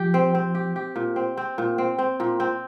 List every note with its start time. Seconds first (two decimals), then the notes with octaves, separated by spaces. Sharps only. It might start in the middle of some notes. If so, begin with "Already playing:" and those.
Already playing: F3 G4
0.14 C4
0.35 C4
0.55 G4
0.76 G4
0.96 A#2
1.16 C4
1.37 C4
1.58 A#2
1.78 C4
1.99 C4
2.20 A#2
2.40 C4